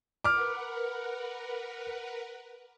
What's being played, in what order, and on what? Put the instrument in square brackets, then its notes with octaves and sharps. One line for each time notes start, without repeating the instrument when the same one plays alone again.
[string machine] A#4 B4 F#5 [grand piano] D6 F6